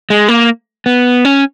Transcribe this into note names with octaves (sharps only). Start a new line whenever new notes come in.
G#3
A#3
B3
C#4